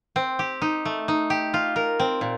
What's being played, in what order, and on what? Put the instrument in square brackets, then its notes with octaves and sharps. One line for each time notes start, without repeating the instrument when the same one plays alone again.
[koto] C4
G4
D#4
A3
D#4
G4
F4
A#4
C4
A#2